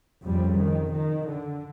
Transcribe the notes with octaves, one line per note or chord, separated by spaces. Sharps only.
F2 C#3 G3
D#3
D#3
D3